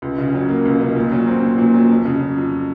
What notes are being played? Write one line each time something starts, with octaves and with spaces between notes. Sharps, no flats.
C#2
C#3
F#3
A#3
C#2
C#3
A#2
F#3
C4
A#2
A#2
F#3
F2
C#3
F#3
F2